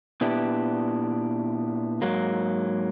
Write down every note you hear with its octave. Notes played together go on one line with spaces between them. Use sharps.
A#2 B3 D4 E4 G4
G#2 F#3 A#3